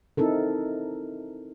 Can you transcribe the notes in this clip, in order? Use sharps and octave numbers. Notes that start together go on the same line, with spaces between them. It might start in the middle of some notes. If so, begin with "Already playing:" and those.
C4 D#4 E4 A4 A#4